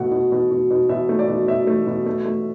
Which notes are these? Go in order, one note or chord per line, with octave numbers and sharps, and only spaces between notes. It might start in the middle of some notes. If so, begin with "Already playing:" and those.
Already playing: B2 A3 F#5
B2
B2
B2
B2
B2 E5
A3
D5
B2
B2 E5
A3
B2
A3
A3